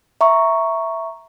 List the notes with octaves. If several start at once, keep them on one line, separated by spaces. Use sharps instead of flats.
E5 A#5 C#6